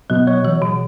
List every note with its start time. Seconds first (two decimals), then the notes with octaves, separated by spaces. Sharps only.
0.10 B2 F#3
0.27 F#3 C#5
0.44 E3 F#3
0.61 B2 F#3